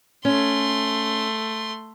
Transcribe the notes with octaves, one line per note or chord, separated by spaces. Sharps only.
A3 C#4 C6